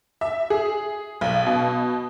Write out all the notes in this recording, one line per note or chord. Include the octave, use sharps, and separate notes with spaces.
E5
G#4
B1
B2